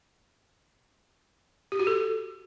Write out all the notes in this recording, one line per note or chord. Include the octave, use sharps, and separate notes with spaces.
G4
F#4
A4